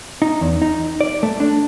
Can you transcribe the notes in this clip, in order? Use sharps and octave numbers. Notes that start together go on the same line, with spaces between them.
D#4
E2
D#4
D5
A3
D4